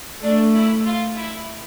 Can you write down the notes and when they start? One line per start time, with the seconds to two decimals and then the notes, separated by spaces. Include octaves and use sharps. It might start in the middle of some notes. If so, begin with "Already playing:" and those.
0.23 A3 D4
0.55 E4
0.86 F4
1.17 E4